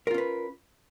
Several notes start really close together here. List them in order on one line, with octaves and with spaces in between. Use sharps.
A#4 F4 C#4 B4